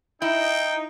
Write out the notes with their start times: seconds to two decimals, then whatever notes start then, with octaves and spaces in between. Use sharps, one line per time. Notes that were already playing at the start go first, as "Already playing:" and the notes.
0.22 D#4 E4 G5